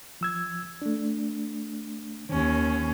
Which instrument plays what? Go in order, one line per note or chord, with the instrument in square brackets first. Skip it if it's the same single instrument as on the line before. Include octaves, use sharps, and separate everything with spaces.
[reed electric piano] F3 E6 G#6
A3 D4
[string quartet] D#2 C#4 [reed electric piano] D#3